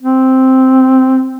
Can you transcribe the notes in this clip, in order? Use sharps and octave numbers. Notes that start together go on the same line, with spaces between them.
C4